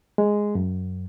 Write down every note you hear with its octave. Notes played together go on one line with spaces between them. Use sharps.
G#3
F#2